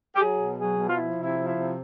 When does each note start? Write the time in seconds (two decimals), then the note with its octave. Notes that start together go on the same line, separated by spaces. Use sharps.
0.16 G4
0.20 F#3 G#4
0.39 B2
0.58 F#3 G#4
0.77 B2
0.89 F4
0.97 F3 E4
1.16 C3
1.23 E4
1.36 F3
1.48 E4
1.55 C3